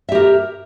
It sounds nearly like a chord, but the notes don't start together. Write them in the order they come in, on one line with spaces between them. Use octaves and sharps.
E5 G4 A#4